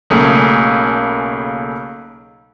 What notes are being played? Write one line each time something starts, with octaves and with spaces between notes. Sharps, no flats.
B1 C#3 A3 A#3 G#4